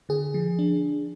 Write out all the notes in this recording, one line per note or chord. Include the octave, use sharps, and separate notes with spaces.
D3 G#4
F3
D4